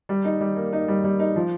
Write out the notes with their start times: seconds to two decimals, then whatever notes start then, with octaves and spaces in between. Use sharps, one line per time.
0.09 G3
0.25 D#4
0.41 G3
0.56 A#3
0.73 D#4
0.88 G3
1.04 G3
1.20 D#4
1.36 F3